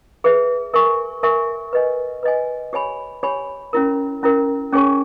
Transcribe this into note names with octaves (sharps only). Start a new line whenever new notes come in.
G#4 B4 E5
A#4 E5 G#5 C#6
A#4 E5 G#5 C#6
B4 D#5 G#5
B4 D#5 G#5
G4 C#5 G#5 B5
G4 C#5 G#5 B5
C#4 E4 A#4
C#4 E4 A#4
C#4 G#4 C#5 G#5 C#6